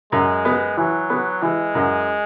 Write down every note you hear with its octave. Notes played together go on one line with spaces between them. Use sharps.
F#2 G#3
B3
E3 F#3
B3
E3 G#3
F#2